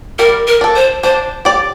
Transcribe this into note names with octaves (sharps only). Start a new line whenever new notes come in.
G3 A#4
A#4
D4 A4
C5
D4 C5
G4 D5